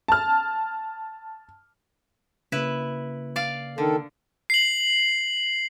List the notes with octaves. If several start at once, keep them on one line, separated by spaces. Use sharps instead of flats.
A5 F6
C#3 A#3 E4 B4
D5 F5
D3 D#3 A4
C7 F#7